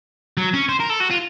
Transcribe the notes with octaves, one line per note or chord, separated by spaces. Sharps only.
F#3
C#4
C5
A#4
A4
F#4
F4